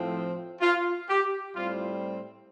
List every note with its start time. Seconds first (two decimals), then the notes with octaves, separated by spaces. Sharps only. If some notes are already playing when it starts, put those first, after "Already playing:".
Already playing: A2 F3 C4
0.61 F4
1.08 G4
1.54 A2 G3 C4 F4